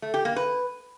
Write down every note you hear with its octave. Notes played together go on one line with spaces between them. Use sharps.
A3
G4
A#3
B4